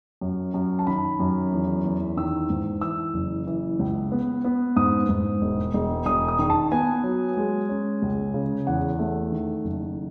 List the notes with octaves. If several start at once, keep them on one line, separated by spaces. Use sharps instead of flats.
F#2
F#2
A5
D#3 B5
F#2
E2
E2
D#3 E6
G#2
E3 E6
F#1
E3
C#2
B3
B3
G#2 D#6
G#2
E1
E1
E1 D#6
D#6
D#3
A5
B3 G#5
F#3
G#3
C#4
C#2
C#3
E2 F#5
A3
D#3
F#1